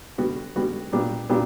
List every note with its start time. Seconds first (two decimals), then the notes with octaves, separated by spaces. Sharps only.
0.18 D3 G3 B3 F#4
0.56 D3 G3 B3 F#4
0.92 A#2 G3 B3 D4 G4
1.29 A#2 G3 B3 D4 G4